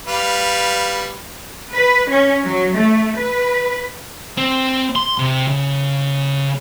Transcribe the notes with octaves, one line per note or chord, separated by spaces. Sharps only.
G3 B4 F5
B4
C#4
F#3
A3
B4
C4
C6
C3
C#3